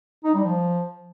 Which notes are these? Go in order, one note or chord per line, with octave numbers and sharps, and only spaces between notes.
D#4
G3
F3